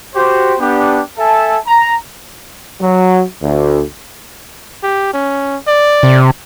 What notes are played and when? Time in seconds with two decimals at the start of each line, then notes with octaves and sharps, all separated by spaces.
0.15 F#4 G4 C5
0.60 B3 D4 G4
1.18 A4 E5 G#5 A5
1.68 A#5
2.81 F#3
3.42 D2
4.84 G4
5.13 C#4
5.68 D5
6.03 C3